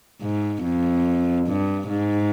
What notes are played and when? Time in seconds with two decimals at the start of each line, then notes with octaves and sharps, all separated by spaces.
0.22 G#2
0.64 F2
1.47 G2
1.89 G#2